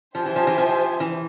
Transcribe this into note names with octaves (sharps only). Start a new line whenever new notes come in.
F3 G4 C5 E5 G#5
E3
F3
E3
F3
E3